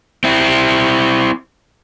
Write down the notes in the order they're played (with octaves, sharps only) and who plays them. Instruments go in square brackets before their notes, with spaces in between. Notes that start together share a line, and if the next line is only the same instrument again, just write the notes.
[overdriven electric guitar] C4 E4